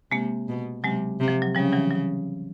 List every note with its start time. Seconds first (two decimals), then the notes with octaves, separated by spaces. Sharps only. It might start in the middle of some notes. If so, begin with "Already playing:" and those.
0.12 C3 G#3 A#3
0.49 B2
0.83 C3 F#3 G#3
1.20 C3
1.28 F3
1.42 F#3
1.55 C#3 F3 G3
1.73 E3 F#3
1.90 F#3